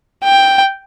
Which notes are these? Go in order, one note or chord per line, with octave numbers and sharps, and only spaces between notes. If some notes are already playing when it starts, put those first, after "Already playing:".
G5